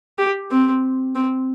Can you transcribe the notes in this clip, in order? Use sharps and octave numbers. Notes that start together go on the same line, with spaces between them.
G4
C4
C4